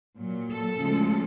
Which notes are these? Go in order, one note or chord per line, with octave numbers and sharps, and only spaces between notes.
A#2 F#3
A4
D2 C#3 F3 G#3